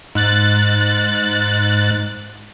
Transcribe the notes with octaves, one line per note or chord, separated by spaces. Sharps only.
G#2 F#6 A6